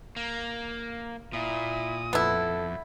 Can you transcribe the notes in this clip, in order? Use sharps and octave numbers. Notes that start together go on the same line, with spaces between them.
A#3
A#2 E4 D#6
F2 B3 E4 A4